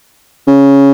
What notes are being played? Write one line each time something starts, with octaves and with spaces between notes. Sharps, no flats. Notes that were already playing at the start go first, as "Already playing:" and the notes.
C#3